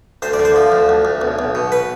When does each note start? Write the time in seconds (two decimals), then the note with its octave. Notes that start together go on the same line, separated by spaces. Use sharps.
0.22 D2 C5
0.33 D5
0.39 D3
0.45 C5
0.56 F3
0.72 D2
0.89 D2
1.05 D2
1.21 B1
1.39 B1
1.55 B2
1.72 B4